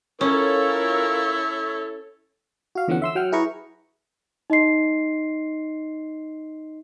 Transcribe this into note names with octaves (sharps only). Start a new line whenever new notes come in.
C#4 E4 F4 A4 A#4 C#5
F#4 F5
E2 D3 F3 B3 C#4 F#5
E5 C6 E6
F#3 F#5 G5 F6
E4 G#4 B4 A#5 C#6
D#4 D#5 C6 C7